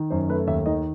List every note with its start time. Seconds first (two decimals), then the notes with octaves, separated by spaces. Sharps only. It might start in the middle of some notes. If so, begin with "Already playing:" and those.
Already playing: D#3
0.10 F#2 C5
0.29 A3 B4
0.47 D#2 E5
0.66 D#3 D#5